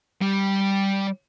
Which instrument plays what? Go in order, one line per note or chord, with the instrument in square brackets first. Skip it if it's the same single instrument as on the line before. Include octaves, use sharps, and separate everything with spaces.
[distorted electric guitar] G3